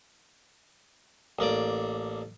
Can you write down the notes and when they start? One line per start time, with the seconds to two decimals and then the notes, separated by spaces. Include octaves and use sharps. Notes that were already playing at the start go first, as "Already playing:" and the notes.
1.39 A1 A#3 D5 D6